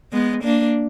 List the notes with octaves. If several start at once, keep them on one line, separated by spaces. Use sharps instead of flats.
G#3 B3
A#3 D4